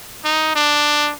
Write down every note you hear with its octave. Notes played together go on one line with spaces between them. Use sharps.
D#4
D4